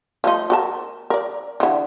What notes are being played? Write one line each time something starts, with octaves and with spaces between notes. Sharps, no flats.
F3 A3 D#4
F#4 A#4 A5
A#4 D5
D3 E3